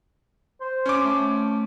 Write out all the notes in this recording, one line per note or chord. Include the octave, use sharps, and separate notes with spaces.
C5
C#4 D6
A3